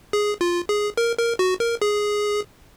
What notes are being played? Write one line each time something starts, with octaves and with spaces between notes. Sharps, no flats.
G#4
F4
G#4
A#4
A#4
F#4
A#4
G#4